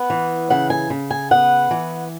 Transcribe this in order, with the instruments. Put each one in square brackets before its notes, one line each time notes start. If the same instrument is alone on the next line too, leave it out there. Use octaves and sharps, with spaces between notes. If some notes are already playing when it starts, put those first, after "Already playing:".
Already playing: [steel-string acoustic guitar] B3 F#5
E3
C#3 F#5
G#5
C#3
G#5
B3 F#5
E3